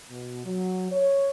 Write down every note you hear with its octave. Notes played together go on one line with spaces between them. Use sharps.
B2
F#3
C#5